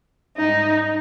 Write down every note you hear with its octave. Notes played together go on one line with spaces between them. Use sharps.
G#2 G3 D#4